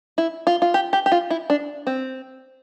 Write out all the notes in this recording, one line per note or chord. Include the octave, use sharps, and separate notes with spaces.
E4
F4
F4
G4
G4
G4
F4
E4
D4
C4